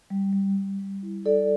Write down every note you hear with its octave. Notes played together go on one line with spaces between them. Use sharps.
G3
G3
G3
G3
E4
G3 A4 D5